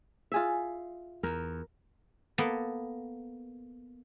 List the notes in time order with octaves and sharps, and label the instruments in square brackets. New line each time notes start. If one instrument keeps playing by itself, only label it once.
[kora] F4 G#4 E5
[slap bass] E2 [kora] A#4
[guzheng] A#3 B3 A4